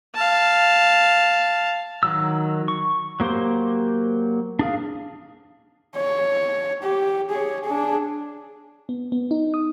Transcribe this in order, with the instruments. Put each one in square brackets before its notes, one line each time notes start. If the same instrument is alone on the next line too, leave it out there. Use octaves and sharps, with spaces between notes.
[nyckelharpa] F5 A5
[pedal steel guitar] D#3 F#3 E6
C#6
F#3 A#3 G4 C5 C6
D4 G#4 F5
[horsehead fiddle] C#5
G4
G#4 C#5
D4 G#4
[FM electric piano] B3
B3
D#4
D#6